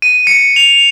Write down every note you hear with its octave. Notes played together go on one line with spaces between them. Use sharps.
D#7
C#7
F7